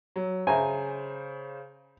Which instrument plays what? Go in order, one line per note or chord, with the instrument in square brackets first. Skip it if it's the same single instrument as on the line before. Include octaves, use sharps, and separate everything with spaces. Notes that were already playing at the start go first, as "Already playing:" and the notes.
[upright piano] F#3
[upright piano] C#3 C5 [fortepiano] G#5 A#5